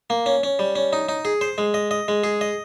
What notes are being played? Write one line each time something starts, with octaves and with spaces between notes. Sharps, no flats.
A#3
C#4
C#4
G3
C#4
D#4
D#4
G#4
C5
G#3
D#5
D#5
G#3
G#4
D#5